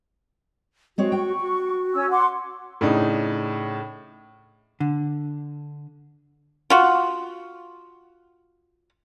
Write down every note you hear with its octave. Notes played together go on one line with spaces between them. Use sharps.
G#3 C4 F#4 C#5
G5 C#6
F#4
C#4 G#5 E6
F#5 C6 D6
A2 C#3 D4 D#4
D3
F4 F#4